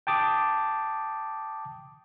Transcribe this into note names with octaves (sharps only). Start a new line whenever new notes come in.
G5 A5 D6 D#6